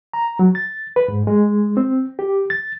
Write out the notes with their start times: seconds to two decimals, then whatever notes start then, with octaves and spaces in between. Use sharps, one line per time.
0.14 A#5
0.39 F#3
0.55 A6
0.96 B4
1.08 G#2
1.27 G#3
1.77 C4
2.19 G4
2.50 A6